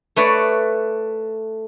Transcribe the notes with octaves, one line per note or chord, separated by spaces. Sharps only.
A3 B4 C#5 D5